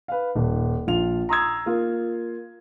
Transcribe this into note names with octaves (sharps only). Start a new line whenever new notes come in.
B4 F5
D#1
A#1 F4 F7
A#5 C6 D#6 E6 G#6
A#3 F4